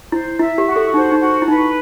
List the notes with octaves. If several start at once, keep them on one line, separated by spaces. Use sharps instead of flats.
E4 C5
E4 E5
G4
F#4
A4
D#4 C5
D#4
F#4
E4
D#4 B4